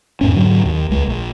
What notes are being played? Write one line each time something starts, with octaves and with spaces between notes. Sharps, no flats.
E2 G#2 C#4
G#2 D3 F#3
D#2
C#2 G#3
A#1